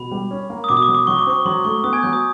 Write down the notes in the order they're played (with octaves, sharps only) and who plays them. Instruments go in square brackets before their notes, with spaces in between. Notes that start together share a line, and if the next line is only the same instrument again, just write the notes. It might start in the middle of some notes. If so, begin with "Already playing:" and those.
Already playing: [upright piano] B2 [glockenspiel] B5
[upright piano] G3
C#4
A#3
[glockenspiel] D#6
[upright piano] B2 [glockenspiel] D6
[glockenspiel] D#6
D6
[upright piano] F#3
[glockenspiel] D6
[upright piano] F#3 [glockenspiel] C#6
[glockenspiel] D6
[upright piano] C4 [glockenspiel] C#6
[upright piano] F#3 [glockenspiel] C6
[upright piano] A3 [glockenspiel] C#6
[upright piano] B3 [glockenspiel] D#6
[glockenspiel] G#5 G#6
[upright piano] F#3 [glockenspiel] G6
[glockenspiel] D#6